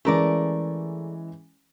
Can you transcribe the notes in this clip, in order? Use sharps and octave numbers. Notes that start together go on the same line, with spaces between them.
E3 G#3 A3 C#4 A#4 D5